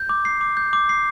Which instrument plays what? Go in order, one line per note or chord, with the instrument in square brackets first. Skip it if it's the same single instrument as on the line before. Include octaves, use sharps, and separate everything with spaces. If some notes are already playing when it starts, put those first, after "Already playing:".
Already playing: [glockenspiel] G6
D6
C7
D6
G6
D6
C7